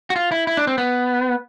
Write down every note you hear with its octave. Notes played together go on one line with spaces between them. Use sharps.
F#4
F4
E4
E4
D4
C4
B3